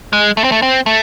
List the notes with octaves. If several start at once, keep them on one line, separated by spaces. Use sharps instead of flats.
G#3
A3
C4
A3
C4
A3